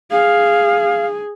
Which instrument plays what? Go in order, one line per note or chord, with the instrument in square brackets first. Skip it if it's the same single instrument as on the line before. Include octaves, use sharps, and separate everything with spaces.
[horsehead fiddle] G#4 [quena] F5